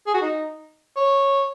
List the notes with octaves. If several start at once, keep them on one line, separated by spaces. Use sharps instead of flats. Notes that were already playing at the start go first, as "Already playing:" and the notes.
G#4
F#4
D#4
C#5